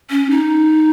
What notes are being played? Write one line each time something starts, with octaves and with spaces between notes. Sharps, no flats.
C#4
D#4